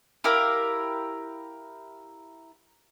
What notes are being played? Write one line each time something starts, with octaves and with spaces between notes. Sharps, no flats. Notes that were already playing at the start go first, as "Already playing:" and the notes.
E4 G4 A#4 F5